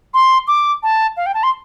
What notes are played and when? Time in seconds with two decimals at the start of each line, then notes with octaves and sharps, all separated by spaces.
0.14 C6
0.48 D6
0.83 A5
1.17 F5
1.26 G5
1.34 A5
1.43 C6